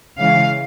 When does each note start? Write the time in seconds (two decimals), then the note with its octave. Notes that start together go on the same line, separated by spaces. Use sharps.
0.18 C#3 E3 G#3 C#4 F5